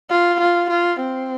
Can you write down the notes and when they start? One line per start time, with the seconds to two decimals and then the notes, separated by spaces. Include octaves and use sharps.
0.10 F4
0.41 F4
0.70 F4
0.99 C4